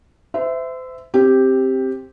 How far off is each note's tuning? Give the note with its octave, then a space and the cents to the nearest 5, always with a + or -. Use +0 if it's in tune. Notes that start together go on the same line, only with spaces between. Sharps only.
C5 -35 E5 +0
C4 +10 G4 +0